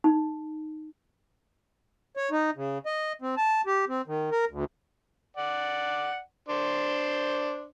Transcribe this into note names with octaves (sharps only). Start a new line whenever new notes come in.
D#4
C#5
D#4
C#3
D#5
C4
A5
G4
C4
D#3
A#4
D2
D5 F#5
D4 C5 C6